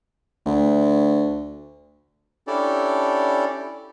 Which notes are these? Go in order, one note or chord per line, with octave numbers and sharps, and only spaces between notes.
D2
C#4 D4 E4 G4 A4 D5